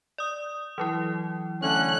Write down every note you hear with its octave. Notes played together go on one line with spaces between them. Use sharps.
D5 D#6
E3 F#3 E4
D3 A3 C#4 F#6